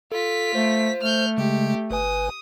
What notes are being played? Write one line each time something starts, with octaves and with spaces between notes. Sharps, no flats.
F4 A4 B6
A3 C5
A3 F6 G6
C#3 G#3 G4
G1 B4 G#5 D#6